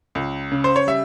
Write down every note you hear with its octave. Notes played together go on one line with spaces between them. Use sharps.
C#2
C#3
C5
C#5
G3 E5